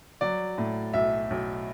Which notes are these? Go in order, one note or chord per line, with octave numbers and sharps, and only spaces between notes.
F#3 D5
A2
B1 E5
B1